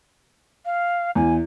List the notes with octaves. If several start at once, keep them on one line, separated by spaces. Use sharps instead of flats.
F5
E2 G#5